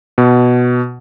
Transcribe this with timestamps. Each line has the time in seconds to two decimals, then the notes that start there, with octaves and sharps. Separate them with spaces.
0.18 B2